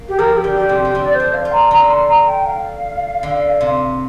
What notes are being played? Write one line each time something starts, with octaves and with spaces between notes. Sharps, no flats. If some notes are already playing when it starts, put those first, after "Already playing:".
Already playing: A#3
G4
F3 A#4
G4
D3
G4
C3
G4
C3
D3
D5
C5
D4
F5
F4
A#5
D3 A#5
C6
A#5
G5
F5
D3
C3